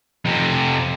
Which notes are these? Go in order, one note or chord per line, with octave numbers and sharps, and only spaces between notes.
F2 C3